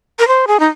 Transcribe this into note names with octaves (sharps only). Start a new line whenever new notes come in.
A#4
C5
G#4
D#4